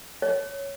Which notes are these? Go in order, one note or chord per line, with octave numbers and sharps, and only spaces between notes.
C#5